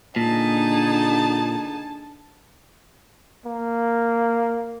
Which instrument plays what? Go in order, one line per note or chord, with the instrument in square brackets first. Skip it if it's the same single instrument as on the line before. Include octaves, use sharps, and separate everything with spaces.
[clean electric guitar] A#2 [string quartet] D3 D#4 G#4 [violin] A5
[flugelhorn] A#3